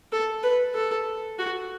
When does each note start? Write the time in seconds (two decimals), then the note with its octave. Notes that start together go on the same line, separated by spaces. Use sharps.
0.12 A4
0.43 B4
0.74 A4
1.38 F#4